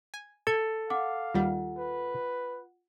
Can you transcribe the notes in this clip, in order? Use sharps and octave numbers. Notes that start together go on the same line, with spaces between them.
G#5
A4 G#6
F5 F#5 D6
D#2 G3 F4 F#5
B4